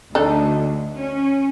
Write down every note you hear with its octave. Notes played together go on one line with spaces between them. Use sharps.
D2 D4 D#4 A4
C#4